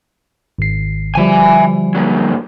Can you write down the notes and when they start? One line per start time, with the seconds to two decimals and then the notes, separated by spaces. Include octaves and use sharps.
0.59 G#1 C7
1.15 D3 F3 G3 E5 G#5
1.95 A#2 F#3